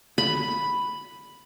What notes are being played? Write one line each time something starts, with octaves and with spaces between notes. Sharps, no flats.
B5